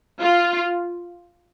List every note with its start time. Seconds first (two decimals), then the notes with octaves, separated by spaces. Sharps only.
0.21 F4